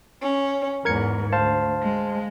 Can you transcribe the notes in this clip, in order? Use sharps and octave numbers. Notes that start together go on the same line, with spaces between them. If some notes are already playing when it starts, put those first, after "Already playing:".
C#4
E2 G#2 A#4 G#6 C#7
D2 C5 F5 A5
G#3